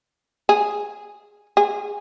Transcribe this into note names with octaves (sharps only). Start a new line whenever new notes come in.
G#4
G#4